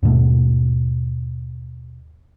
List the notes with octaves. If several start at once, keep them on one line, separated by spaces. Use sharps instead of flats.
D#2 G#2 B2 A3